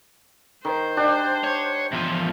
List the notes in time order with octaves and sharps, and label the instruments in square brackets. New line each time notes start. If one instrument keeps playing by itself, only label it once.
[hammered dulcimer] D#3 [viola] C5
[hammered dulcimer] D4 G4 F#5
[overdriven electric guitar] C#5
E2 F3